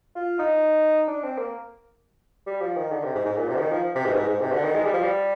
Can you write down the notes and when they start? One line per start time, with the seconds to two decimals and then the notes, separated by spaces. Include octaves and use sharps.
0.15 F4
0.39 D#4
1.07 D4
1.23 C4
1.38 A#3
2.46 G3
2.61 F3
2.76 D#3
2.92 D3
3.04 C3
3.15 G#2
3.26 G#2
3.37 A#2
3.48 C3
3.56 D3
3.60 D#3
3.72 F3
3.95 C3
4.06 G#2
4.13 G2
4.18 G#2
4.29 G#2
4.41 C3
4.52 D3
4.64 D#3
4.75 G#3
4.84 G3
4.93 F3
5.03 G3